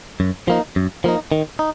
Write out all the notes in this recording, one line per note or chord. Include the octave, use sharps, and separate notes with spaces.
F#2
F3 A#3 D#4
F#2
F3 A#3 D#4
D#3
D#4